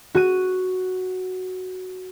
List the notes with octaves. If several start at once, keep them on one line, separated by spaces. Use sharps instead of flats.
F#4 F#6 D#7